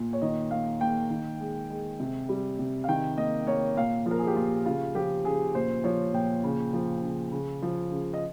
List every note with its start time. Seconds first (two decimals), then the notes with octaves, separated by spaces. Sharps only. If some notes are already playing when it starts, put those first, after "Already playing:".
Already playing: A#2
0.13 C#5
0.21 D#3 D#5
0.51 A#3 F5
0.81 A#3 G5
1.10 D#3
1.40 G#3
1.70 G#3
2.00 C3
2.29 G3
2.59 C3
2.84 F5
2.88 D#3 G5
3.17 A#3 D#5
3.47 A#3 C#5
3.77 A#2 F5
4.06 F3
4.11 A#4
4.19 G#4
4.27 G4
4.36 A#2 F4
4.65 C#3 F4
4.95 F3 G4
5.25 C#3 G#4
5.55 A#2 C5
5.84 F3 C#5
6.13 A#2 G5
6.44 C#3
6.73 F3
7.02 C#3
7.32 C#3
7.62 F3
7.91 C#3
8.13 D#5